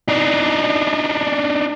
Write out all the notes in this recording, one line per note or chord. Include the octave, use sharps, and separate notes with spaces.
D4 D#4